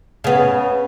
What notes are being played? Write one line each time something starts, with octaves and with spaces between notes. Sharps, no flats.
C#3 B3